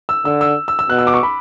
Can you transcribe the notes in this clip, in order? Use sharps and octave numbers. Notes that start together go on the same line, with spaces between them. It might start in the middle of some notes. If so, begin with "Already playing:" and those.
E6
D3 E6
E6
E6
E6
B2 F#6
E6
D6
C#6
B5